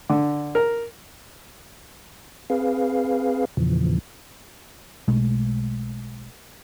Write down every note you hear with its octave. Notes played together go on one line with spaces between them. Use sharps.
D3
A#4
C4 G#4 B4 F5
E2 A#2 C#3 E3 F3
B1 B2 G#3 A3